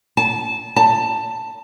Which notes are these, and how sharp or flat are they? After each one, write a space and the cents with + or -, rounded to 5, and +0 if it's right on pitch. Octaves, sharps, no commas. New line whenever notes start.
A5 -20
A5 +10